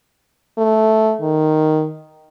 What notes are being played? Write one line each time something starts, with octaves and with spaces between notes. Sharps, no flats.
A3
D#3